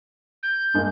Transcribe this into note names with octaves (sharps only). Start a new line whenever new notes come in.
G6
G2 G#3 A#3